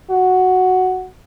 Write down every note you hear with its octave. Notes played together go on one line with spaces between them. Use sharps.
F#4